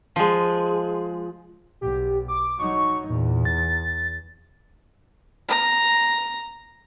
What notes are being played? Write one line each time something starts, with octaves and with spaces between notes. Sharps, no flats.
F3 G#3
B1 G4
D6
F#3 D#4 C#6
E2 A#2
A6
A#5